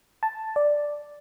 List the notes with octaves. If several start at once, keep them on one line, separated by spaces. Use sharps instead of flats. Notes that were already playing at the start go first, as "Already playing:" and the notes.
A5
D5